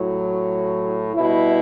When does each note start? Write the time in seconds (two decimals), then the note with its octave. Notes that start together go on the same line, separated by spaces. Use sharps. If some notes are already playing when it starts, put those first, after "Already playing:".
Already playing: A2 F#3
1.15 B2 G3 E4